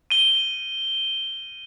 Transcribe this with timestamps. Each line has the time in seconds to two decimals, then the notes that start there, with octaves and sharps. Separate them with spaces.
0.10 D#7 G7